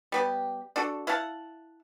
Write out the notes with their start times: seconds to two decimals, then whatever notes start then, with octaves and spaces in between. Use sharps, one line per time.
0.12 G3 B3 G4
0.76 D4 F#4 A4
1.07 E4 F5 F#5 A5